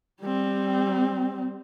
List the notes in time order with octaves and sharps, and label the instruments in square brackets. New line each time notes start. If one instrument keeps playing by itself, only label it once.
[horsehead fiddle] G3 C4